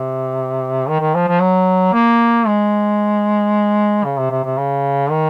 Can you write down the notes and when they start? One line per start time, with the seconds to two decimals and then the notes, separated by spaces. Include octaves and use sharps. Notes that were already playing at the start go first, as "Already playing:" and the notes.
Already playing: C3
0.88 D#3
1.01 D#3
1.15 F3
1.28 F3
1.40 F#3
1.93 A#3
2.47 G#3
4.05 C#3
4.18 C3
4.31 C3
4.44 C3
4.58 C#3
5.10 D#3